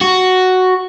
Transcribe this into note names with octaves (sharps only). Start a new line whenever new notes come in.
F#4